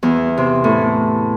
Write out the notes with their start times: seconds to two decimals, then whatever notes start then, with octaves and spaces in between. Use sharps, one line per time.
0.03 E2
0.37 C3
0.64 A2